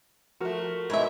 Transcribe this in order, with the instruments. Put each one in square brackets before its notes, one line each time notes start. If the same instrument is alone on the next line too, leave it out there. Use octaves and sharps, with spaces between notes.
[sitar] F3 A3 [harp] F#4 A#4
[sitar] G#2 B2 [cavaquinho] C#5 E5